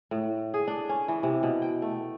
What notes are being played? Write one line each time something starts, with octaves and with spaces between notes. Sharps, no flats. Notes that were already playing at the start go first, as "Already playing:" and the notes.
A2
G#4
D4
C#4
E3
C3
B2
G5
A3